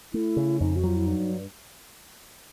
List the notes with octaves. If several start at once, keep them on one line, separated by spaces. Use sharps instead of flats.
A3 E4
C#3
F2 D#4
F#4
F#3 F4
E4
G2 D#4